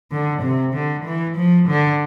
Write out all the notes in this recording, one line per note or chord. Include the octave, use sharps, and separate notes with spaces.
D3
C3
D3
E3
F3
D3